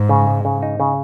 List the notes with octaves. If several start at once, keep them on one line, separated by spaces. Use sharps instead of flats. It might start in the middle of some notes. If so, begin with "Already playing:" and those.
Already playing: G#2
C#3
G#3
C#3
D#4
C#3